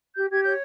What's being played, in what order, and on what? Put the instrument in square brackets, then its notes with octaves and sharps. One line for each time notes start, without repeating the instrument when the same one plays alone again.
[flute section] G4 G6
G4 G#6
C#5 G6